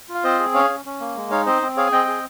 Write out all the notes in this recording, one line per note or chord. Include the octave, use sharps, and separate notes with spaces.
F4
F5
C4 C5 D#5
G#4
C#4 C#5 F5
C#4
C#4
A#3
G#3
D#4 C#5 F5
C4 C5 D#5
C4
G#4 C#5 F5
G#5
C4 D#5 G5
G#4